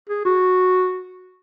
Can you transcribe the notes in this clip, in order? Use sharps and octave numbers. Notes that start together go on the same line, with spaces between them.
G#4
F#4